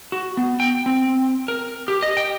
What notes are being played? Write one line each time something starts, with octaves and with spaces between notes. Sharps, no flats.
F#4
B3
G5
C4
A#4
G4
D#5
G5